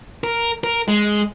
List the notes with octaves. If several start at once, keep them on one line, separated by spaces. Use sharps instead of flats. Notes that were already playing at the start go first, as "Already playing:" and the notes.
A#4
A#4
G#3